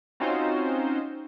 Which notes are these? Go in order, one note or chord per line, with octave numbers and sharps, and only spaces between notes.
C4 C#4 D#4 F4 F#4 C5